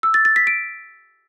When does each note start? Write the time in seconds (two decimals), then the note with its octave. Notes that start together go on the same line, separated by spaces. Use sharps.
0.03 E6
0.14 A6
0.25 A6
0.36 B6
0.47 D7